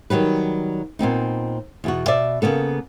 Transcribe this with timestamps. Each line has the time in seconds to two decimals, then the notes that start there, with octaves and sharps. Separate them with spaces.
0.10 D#3 F#3 G3 B4
0.99 A#2 B3 C4 D#4
1.84 E2 B2 F#4
2.08 B2 D5 E5
2.42 C#3 A#3 B3 A4